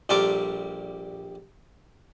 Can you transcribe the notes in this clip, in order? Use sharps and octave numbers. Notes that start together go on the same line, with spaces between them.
A#1 G3 A4 A#4 C6 D6